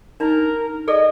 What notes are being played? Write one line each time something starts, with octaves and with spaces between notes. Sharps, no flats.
D4 D#4 A#4
G#4 A4 D5 D#5